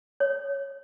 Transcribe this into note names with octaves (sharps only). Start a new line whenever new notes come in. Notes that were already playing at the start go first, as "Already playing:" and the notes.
C#5